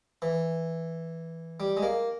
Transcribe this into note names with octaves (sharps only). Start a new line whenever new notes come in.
E3
G3
G#3
A#3